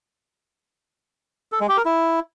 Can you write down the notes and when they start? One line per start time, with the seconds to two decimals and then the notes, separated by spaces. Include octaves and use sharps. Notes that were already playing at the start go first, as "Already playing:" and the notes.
1.52 A4
1.60 G#3
1.69 G4
1.77 A#4
1.85 E4